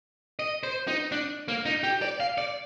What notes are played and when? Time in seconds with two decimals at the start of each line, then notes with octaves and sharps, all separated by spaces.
0.39 D#5
0.63 C5
0.88 D#4
1.12 D4
1.48 A#3
1.66 D#4
1.84 G4
2.02 D5
2.20 F5
2.38 D5